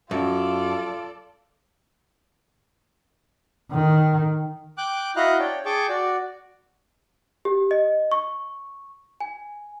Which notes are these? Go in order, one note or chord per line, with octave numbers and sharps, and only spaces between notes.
F#2 F4 A4 D5
D#3
G5 D6 F#6
E4 F#4 D#5 F5 A#5 F#6
D4 C#5 G5
G#4 G5 A5 C#6 D6
F#4 D5
G4
D#5
C#6
G#5